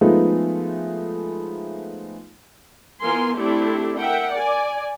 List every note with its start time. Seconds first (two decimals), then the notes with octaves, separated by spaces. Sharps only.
0.01 F3 G#3 A3 B3 D#4 F4
3.01 E3 B3 F4 A#4 G#5 C6
3.36 A3 C4 D4 E4 G4 A4
3.98 A#4 E5 F#5 G5
4.31 D5 G#5